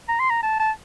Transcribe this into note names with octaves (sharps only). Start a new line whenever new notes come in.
A#5
C6
A#5
A5
A5